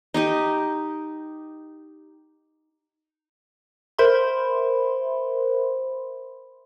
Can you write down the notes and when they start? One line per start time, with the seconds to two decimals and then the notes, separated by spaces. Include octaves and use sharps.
0.14 D#4 G4 D#5
3.98 A#4 C5 E5 B5 C6